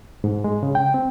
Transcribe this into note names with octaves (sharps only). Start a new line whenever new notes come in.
G#2
G#3
C#3
G5
C4